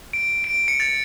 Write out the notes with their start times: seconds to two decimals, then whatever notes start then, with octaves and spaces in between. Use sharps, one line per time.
0.13 D7
0.44 D7
0.68 C#7
0.80 A6